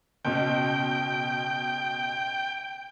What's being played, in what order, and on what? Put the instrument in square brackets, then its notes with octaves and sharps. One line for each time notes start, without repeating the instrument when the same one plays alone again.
[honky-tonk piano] F#1 B2 [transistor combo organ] G5